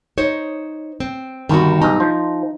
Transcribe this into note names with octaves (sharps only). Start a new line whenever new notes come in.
D#4 C5 C#5
C4
G1 C2 D#3 G3 F#4
B1 G2 D#4
F3 C5